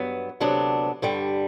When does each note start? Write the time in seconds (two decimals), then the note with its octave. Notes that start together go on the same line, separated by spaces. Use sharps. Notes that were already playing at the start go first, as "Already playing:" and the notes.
Already playing: G2 F#3 B3
0.40 D2 C3 F#3 B3 D4
1.02 G2 D3 G3